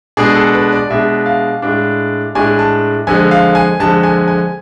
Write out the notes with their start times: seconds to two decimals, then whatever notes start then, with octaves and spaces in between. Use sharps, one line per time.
0.17 B2 G#3 D4 G#4
0.35 A4
0.53 B4
0.72 D5
0.90 B2 G#3 D4 E5
1.26 F5
1.62 A2 G#3 D4
2.35 A2 G#3 D4 G#5
2.59 A5
3.07 F2 D3 G#3 G#5
3.31 F5
3.55 G#5
3.80 F2 D3 G#3 A5
4.03 G#5
4.28 G#5